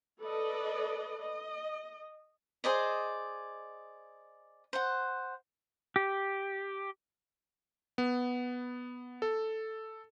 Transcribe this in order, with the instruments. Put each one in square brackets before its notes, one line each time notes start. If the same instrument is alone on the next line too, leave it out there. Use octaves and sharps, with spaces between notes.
[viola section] A4 B4 D5 D#5
D#5
[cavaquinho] G#4 C5 D5 D#5
C5 F#5
[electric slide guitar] G4
[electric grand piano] B3
A4